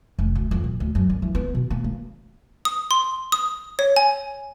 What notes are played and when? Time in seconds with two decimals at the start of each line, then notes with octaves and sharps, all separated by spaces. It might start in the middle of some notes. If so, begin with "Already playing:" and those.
0.19 F1
0.35 D2
0.51 F2
0.64 A#2
0.80 D2
0.95 F#2
1.10 G2
1.22 E3
1.35 B3
1.55 B2
1.70 A#3
1.84 A#3
2.65 D#6
2.91 C6
3.32 D#6
3.79 C#5
3.96 G#5